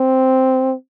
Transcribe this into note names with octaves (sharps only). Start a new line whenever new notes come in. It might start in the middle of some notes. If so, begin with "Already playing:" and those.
Already playing: C4